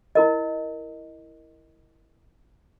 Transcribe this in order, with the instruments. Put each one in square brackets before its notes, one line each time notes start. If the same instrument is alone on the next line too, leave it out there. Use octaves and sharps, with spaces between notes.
[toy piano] E4 A#4 D#5